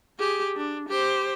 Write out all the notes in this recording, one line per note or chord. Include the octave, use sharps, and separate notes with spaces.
G4 G#4
D4
G4 C5